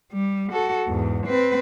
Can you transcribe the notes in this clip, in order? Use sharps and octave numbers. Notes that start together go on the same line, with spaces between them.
G3
F#4 A4
E2 G#2
C4 B4